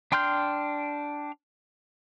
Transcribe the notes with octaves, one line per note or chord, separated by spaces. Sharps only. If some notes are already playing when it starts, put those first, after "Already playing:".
D4 G5 C6 F6 G6